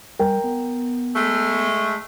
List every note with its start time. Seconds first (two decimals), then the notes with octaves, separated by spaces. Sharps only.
0.19 G3 A#4 G5
0.44 B3
1.16 G#3 A3